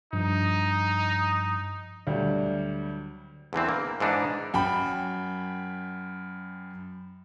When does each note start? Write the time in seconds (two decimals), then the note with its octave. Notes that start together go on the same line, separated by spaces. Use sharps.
0.13 G2 F3 D#4
2.07 D2 F#3 G3
3.53 E2 D3 E3 C4
3.69 A#3
4.00 G#2 E3 D4 D#4
4.54 F#2 G5 B5